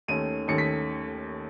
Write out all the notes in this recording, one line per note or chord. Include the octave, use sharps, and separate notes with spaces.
D#2 D#3 A3 C#4 D#7
D#2 D#3 A3 C#4 C#7
B6